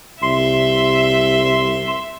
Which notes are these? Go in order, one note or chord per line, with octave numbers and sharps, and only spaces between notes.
C2 E5 C6